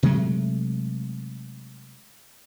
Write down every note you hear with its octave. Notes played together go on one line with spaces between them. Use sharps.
C3 F#3 G#3 A3